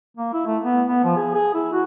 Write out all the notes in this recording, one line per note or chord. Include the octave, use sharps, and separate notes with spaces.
A#3
E4
A3
B3
B3
F3
G#4
G#4
E4
F#4